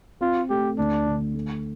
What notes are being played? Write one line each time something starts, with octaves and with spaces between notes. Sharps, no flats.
C4 F4
A3 G4
D2 D4
D3
A3